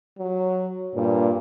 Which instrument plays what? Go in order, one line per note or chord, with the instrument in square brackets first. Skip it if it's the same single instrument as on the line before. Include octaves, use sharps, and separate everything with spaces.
[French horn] F#3
[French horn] G2 [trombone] A#2